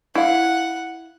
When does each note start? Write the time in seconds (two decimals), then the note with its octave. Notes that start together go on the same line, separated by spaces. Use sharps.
0.15 E4 F5 F#5